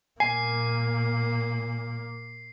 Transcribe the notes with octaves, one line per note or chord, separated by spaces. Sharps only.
A#2 A#3 G#5 C7